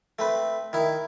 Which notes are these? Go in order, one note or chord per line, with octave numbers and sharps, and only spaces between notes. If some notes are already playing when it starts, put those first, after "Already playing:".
A3 C4 B4
D#3 E4